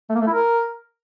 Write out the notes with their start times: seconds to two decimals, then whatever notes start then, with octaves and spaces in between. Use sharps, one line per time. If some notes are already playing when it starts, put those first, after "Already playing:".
0.10 A3
0.16 A#3
0.21 A3
0.27 E4
0.33 A#4